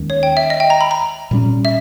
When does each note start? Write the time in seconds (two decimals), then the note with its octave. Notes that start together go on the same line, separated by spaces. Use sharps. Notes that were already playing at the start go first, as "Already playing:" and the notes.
Already playing: D#2 D#3 G#3 C#4
0.10 C#5
0.23 G5
0.37 E5
0.50 D#5
0.60 G5
0.70 A#5
0.81 B5
0.91 A#5
1.31 A#2 G3 C#4
1.65 E5